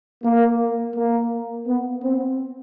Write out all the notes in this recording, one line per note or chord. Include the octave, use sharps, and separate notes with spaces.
A#3
A#3
B3
C4